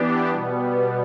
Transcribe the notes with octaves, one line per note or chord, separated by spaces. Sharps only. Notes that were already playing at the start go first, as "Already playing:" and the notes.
Already playing: E3 B3 D4 G4
B2 G3 B3